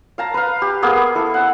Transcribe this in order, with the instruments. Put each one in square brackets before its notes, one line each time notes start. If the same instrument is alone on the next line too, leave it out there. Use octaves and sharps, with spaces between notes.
[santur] F5 A5 A#5
B4 F5
G4
A#3 B3 G#4
E4 A4
F#5 E6